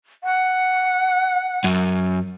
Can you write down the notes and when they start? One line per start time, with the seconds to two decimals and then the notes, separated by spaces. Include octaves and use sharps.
0.23 F#5
1.64 F#2